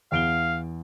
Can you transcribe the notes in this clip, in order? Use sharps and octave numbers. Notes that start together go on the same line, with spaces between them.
E2 F5 D7 G7